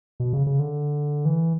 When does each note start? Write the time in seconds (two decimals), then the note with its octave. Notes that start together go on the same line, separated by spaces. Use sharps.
0.20 B2
0.33 C#3
0.47 C#3
0.59 D3
1.25 E3